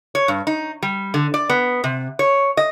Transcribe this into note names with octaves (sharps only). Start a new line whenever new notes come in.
C#5
G2
D#4
G3
D3
D5
B3
C3
C#5
D#5